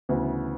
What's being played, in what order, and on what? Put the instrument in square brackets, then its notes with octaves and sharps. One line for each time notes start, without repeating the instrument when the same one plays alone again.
[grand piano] D2 C#3 E3 B3